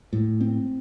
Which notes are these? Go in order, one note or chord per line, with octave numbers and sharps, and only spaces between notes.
A2
C4